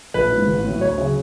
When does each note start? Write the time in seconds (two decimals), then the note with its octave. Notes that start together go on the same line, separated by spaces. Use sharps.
0.14 A#1 B4
0.31 G#2 F3
0.47 A1
0.64 A2 F#3
0.81 D2 C#5
0.98 C#3 F#3